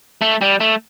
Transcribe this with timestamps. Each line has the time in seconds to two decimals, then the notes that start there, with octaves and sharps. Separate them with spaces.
0.21 A3
0.41 G3
0.60 A3